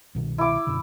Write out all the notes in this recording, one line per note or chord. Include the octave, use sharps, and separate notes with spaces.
C2 B2 D#3
E4 D6
F#2 B2 D3